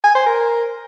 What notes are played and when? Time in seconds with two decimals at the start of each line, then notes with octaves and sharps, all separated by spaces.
0.04 G#5
0.15 C5
0.26 A#4